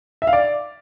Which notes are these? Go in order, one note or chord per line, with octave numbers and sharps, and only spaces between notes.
E5
F5
D5